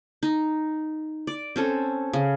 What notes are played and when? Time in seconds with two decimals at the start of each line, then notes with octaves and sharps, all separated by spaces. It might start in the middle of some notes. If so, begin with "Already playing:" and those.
0.23 D#4
1.27 D5
1.56 C4 C#4 A4
2.13 C#3